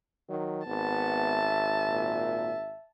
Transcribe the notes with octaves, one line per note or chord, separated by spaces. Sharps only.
D#3 F#3
G#1 B3 A5
E5
A#2